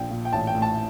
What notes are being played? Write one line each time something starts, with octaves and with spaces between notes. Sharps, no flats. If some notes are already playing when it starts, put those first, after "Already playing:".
Already playing: A#1 G5
A#2
G5
A1 A5
G5
A2
A5